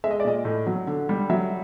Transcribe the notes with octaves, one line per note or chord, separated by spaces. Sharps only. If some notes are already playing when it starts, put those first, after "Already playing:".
G#3 E5
D#5
D5
A#2 D#5
A2
F#3
D3
G3
F#3 E5